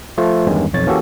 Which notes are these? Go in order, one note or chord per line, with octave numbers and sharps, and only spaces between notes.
F3 A3 F4
E2 G2 D#3 G#3 C#4
B1 F2 C#5 A6
E3 A#3 C#4 F#4 G4 A4